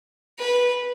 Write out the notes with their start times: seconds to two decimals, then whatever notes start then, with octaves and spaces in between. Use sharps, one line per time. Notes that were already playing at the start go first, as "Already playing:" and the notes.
0.38 B4